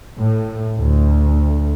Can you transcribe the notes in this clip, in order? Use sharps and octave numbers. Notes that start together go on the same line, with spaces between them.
A2
D2